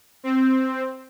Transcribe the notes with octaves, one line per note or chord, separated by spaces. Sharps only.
C4